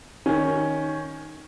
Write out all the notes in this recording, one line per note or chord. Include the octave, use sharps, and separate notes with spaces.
D#3 C#4